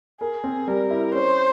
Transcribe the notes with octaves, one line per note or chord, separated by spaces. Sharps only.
G#4 A#4
C4
G3 A#4
E4
C#4 C5